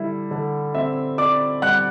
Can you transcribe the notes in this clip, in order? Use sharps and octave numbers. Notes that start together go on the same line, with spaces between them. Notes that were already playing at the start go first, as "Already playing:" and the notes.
Already playing: D3 G3 E4
D3
C4 E5
C4 D5 D6
G3 F#5 F#6